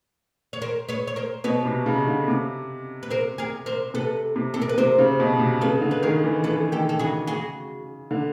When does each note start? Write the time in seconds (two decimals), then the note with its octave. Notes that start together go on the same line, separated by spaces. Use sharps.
0.53 C#5
0.62 A#4 C5
0.89 B4 C#5
1.07 C#5
1.16 A#4 C5
1.44 B2 B4 C#5
1.65 C3
1.86 C#3
2.07 D3
2.28 C3
3.03 B4
3.10 A#4 C5
3.38 G#4 A#4
3.66 A#4 C5
3.94 C3 A4 B4
4.36 C3
4.54 C3 A4
4.62 A#4
4.69 B4
4.78 C3 A#4 C5
4.98 C#3
5.20 B2
5.40 C3
5.61 C#3 A4 B4
5.81 D3
5.91 B4
6.03 D#3 G#4 A#4
6.24 E3
6.44 E3 A4 B4
6.72 D#3 G4 A4
6.89 A4
6.99 C#3 F#4 G#4
7.27 F#4 G#4
8.11 D3